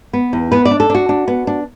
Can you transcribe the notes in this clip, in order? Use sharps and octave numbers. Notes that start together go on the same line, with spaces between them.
B3
E2
B3 B4
D5
D4
A4
D4 F#4
D4
B3
D4